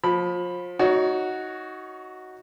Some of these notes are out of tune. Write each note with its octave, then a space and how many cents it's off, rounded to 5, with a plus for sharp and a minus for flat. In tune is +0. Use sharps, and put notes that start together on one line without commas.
F3 +30 B5 +0
D#4 +15 F#4 +0 C#5 +30